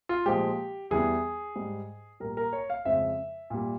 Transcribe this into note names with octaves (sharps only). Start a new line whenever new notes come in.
F4
A#2 F3 G#3 G4
E2 E3 G3 G#4
G#2 G3
A#2 G3 A#4
A#4
C#5
F5
F2 C#3 F3 G#3 E5
A#2 G3